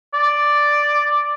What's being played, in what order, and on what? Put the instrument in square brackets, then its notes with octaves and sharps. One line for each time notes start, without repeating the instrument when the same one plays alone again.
[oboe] D5